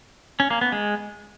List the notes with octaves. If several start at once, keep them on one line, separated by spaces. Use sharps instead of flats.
C#4
A#3
B3
G#3